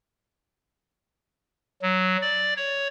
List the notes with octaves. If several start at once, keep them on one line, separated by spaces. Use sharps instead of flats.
F#3
D5
C#5